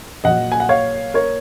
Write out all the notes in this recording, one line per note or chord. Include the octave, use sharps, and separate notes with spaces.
A#1 A#2 F#3 D#5 F#5
G#5
F#5
C#5 F5
A#4 C#5